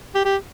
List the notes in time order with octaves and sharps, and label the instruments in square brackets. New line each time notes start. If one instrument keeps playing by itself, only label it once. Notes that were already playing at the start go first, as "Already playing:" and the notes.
[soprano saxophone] G4
G4